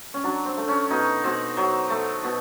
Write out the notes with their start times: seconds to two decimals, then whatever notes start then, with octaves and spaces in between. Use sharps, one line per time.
0.14 C#4
0.24 F#3 D4
0.46 C4
0.57 A3
0.68 C#4
0.90 B2 D#4
1.24 B2 C4
1.57 F#3
1.90 A3
2.24 B2